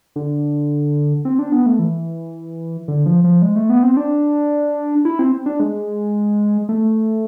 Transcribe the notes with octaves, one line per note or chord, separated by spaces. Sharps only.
D3
C4
D4
B3
A3
E3
D3
F3
F3
G#3
A3
B3
C4
D4
E4
C4
D4
G#3
A3